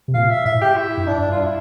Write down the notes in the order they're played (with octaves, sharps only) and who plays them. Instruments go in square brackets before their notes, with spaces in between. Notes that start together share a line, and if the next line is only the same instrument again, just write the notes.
[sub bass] C3
[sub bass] A#2 [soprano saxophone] F5
[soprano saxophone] E5
[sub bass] A2 [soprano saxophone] E5
[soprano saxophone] G4
E4
[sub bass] G2
[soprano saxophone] D4
[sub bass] G2
[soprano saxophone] F4
E4